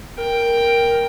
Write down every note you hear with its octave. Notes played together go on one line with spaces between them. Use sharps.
A#4 G5